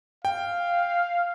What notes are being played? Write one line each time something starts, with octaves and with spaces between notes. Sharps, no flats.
F5 G5